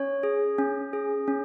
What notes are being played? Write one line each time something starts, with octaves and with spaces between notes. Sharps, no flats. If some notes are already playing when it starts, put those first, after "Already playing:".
Already playing: C#4 C#5
G#4
C#4
G#4
C#4